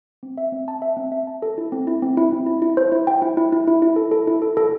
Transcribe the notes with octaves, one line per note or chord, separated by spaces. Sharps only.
C4
E5
C4
A5
E5
C4
E5
A5
A4
E4
C4
E4
C4
E4
C4
E4
E4
C5
E4
G5
E4
E4
E4
E4
E4
A4
A4
E4
A4
A4